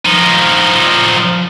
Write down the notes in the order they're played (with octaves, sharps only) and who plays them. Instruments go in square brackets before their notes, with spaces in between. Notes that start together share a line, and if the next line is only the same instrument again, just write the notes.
[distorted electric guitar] F3 D#4